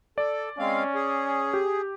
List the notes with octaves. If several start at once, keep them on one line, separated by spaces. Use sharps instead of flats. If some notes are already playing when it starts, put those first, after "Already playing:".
A4 D5
G#3 C4 C#4 F5
G#4
G4